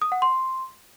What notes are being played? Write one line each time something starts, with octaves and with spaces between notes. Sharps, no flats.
D#6
F#5
C6